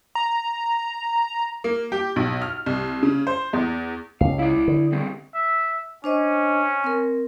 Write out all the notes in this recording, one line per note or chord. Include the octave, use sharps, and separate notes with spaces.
A#5
A#3
G4
B1
F6
C2
C#3
C5
E2
C#2 F5
E4 D5
D3
G3 G#3 C4
E5
C#4 D4 C5 D#5
C4 A#4